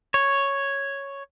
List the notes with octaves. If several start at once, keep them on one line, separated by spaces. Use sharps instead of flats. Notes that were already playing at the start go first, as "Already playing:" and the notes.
C#5